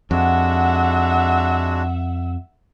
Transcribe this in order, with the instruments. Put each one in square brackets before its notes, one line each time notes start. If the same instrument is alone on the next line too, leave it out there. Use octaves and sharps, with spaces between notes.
[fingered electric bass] F2 [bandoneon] G#3 D4 F#4 [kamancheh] E5 F#5